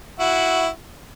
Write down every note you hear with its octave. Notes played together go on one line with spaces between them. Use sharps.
E4 F#4